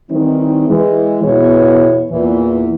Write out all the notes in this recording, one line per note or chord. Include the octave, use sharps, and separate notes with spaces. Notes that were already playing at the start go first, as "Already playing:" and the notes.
D#3 E3 G3 C4 D#4 E4
E3 G#3
E2 B2 B3 E4 G#4 C#5
E2 A#2 E3